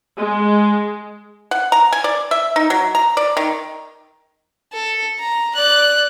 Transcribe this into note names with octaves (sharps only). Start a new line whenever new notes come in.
G#3
F#5
A#5
G#5
D5
E5
D#4
F#3
A#5
D5
D#3
A4
A#5
D5 F#6